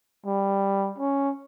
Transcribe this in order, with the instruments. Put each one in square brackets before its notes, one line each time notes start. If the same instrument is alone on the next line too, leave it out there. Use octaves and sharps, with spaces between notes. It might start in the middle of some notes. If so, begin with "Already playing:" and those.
[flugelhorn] G3
C#4